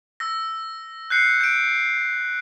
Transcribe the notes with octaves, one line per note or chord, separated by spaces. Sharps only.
E6 A#6
F#6 G6 C7 C#7
G6 D7